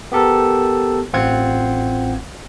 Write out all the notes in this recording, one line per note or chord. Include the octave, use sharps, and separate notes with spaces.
B3 G4 A4 A#4
A1 C4 F4 F#5 G#6